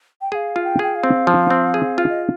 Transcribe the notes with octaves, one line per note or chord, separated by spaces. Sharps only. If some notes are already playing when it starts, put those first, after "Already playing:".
G5
G#4 F5 G5
F4
G5
G#4 G5
F5
C4
F3
C4
G#4
F4
D#5